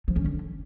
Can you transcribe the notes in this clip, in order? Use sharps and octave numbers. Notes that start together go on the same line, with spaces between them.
F3
C#4
D3